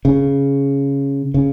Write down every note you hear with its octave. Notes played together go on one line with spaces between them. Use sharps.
C#3
C#3